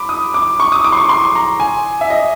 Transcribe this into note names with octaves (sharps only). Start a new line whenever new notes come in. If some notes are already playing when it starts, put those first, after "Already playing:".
Already playing: B5 D6
D#6
D6
C#6
D#6
D6
C6
C#6
C6
A#5
G#5
E5
D#5